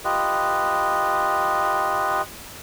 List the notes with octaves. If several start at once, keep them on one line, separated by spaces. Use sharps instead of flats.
F4 G4 B4 D#5